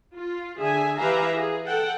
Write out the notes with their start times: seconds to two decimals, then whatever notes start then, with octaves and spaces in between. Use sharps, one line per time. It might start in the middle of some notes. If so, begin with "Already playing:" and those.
0.15 F4
0.59 D3 G#4 E5 G#5
0.99 E3 G4 B4 E5 F5 A#5
1.36 G#4
1.66 A4 F#5 G5